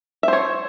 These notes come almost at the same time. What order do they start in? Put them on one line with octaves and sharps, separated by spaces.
E5 C5 C#5